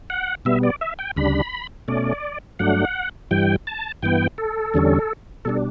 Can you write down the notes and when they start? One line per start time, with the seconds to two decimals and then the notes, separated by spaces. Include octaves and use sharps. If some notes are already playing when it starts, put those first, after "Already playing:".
0.10 F#5
0.45 B2 G3 B3 E5
0.63 D5
0.81 E5
0.99 G5
1.16 D2 C#3 G3 D4 B5
1.88 B2 A3 C#4 D5
2.59 G2 F#3 A3 D4 F#5
3.31 G2 E3 G3 G5
3.67 A5
4.02 G2 E3 B3 G5
4.38 A4
4.74 E2 D3 G3 C#4
5.45 B2 G3 D4 A4